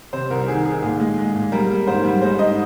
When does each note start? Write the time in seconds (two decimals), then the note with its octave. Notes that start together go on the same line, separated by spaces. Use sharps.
0.13 C3 C5
0.30 C2 A#4
0.48 D#3 G#4
0.65 D#3 G#4
0.83 A#2 G#4
1.00 G#3
1.18 G#3
1.35 A#2
1.52 G3 A#4
1.70 A#3
1.87 G#2 C5
2.04 G3
2.21 G#3 C5
2.39 G#2 D#5